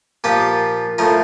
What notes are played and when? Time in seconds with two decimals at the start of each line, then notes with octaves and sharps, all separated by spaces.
0.24 A#2 F3 G4
0.98 A2 F3 A#4